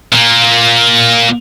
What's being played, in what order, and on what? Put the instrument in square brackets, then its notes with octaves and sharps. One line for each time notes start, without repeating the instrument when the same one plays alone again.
[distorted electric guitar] A#2 A#3